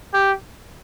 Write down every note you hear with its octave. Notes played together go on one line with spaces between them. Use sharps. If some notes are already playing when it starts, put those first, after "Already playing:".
G4